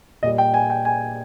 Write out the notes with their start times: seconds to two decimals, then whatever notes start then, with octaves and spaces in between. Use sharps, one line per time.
0.23 A#2 G3 D#5
0.38 G5
0.54 G#5
0.70 G5
0.85 G#5